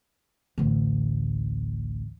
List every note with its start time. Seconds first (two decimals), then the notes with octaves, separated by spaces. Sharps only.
0.58 A1 D2